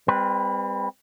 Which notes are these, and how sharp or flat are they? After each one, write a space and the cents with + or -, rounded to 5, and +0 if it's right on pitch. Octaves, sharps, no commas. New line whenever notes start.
G3 +35 C4 -10 B4 -5